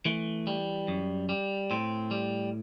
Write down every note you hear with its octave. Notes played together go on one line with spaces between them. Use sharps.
E3 A3
G3
F#2
G3
A2 C4
G3